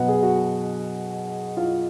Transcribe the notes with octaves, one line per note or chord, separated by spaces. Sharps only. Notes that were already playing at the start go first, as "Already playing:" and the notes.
Already playing: B2 F#3 B3 D#5 F#5
G#4
F#4
F4